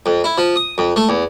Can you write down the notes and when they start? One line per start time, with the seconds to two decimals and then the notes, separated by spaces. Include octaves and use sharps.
0.06 F2
0.24 E4
0.38 F3
0.56 D#6
0.78 F2
0.96 A3
1.09 E2